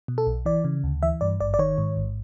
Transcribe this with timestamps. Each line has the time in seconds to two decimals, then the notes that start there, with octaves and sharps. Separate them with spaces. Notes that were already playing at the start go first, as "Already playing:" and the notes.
0.08 B2
0.18 A4
0.27 B1
0.46 E3 D5
0.64 C#3
0.84 D2
1.03 E3 E5
1.21 G2 D5
1.40 G#1 D5
1.54 D5
1.59 D#3 C#5
1.78 G#2
1.97 A1